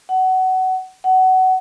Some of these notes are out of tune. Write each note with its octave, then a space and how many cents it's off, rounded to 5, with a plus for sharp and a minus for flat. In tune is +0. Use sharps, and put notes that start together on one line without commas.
F#5 +20
F#5 +20